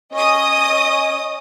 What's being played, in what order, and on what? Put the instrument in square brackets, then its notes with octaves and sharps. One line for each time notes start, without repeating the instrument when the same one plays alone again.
[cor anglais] C#4 [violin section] D#5 D#6